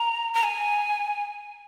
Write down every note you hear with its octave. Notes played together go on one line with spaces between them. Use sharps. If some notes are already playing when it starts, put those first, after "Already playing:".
Already playing: A#5
A#5
G#5